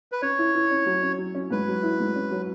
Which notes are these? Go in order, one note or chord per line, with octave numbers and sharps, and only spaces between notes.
B4
C#4 C#5
E4
E4
C#4
F#3
C#4
F#3
C#4
G#2 B4
F#3
E4
G#2
C#4
F#3